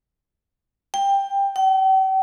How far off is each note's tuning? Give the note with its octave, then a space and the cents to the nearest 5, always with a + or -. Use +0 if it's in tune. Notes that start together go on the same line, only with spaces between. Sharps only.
G5 +15
G5 -45